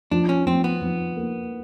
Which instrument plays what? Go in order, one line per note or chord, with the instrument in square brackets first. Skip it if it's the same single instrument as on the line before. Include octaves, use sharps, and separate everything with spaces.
[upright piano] F3 [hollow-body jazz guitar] D4
[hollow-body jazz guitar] C#4
[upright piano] F3 [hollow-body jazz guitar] C4
[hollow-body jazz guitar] B3
[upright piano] F3
A#3